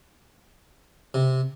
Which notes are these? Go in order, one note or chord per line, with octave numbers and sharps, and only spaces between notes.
C3